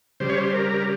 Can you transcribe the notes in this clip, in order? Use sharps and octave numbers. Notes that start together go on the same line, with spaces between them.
C#3 G3 C5
C#5
C5
A#4